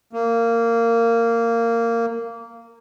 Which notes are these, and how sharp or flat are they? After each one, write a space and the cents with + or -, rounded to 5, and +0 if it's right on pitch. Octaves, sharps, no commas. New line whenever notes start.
A#3 -15